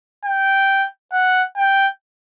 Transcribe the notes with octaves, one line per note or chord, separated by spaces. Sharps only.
G5
F#5
G5